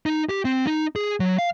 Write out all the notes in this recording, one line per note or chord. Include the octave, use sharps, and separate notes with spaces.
D#4
G4
C4
D#4
G#4
F#3
F5